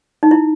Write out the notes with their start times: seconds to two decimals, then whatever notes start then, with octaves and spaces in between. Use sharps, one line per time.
0.23 D#4
0.31 E4